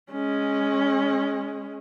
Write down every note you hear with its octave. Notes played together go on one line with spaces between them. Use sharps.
G#3 C#4